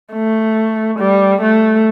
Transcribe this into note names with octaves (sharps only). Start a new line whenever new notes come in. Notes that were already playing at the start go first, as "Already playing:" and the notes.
A3
G3
A3